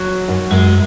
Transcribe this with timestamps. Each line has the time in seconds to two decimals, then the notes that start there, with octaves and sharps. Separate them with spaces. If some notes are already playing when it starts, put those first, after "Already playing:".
Already playing: F#3
0.28 F#2
0.51 F#2 G#3